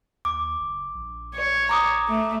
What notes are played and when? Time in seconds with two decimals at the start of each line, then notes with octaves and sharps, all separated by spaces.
0.25 D#2 D6
0.60 F#1
0.95 A#1
1.36 C#5
1.69 A#5 D6 D#6
2.09 A3